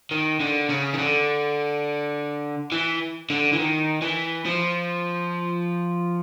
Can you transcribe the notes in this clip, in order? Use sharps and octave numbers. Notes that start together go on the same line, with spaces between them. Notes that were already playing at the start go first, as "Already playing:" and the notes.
D#3
D3
C#3
D#3
D3
E3
D3
E3
D#3
E3
F3